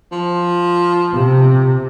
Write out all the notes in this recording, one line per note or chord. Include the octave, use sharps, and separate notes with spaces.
F3
C3